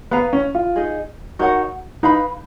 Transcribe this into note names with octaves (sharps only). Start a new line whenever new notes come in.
B3 B4 F5 A#5
C#4
F4
D#4 G#4 D#5
D#4 F#4 A#4 C#5 F#5
D#4 B4 F5 B5